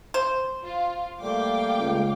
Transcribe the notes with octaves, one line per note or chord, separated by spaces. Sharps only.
C5
F4
G3 A3 A#3 F5 G5 D6
C#2